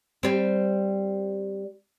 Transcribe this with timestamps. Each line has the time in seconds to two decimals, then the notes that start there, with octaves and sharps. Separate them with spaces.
0.23 G3 C4